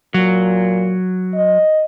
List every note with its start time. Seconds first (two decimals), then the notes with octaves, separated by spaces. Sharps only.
0.14 A#2 F#3
1.34 D#5